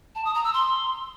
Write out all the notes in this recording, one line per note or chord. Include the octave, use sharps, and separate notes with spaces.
A5
D#6
A#5
E6
C6